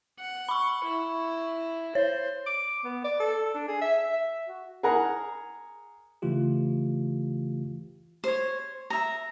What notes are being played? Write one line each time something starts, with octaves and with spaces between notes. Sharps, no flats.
F#5
B5 C#6
E4
C5 C#5
D6
B3
D5
A4
D4
G#4
E5
E5
F#4
G#4 A#4 F#5 A#5
C#3 E3 A3 F4 G4
C5 C#5
E5 A#5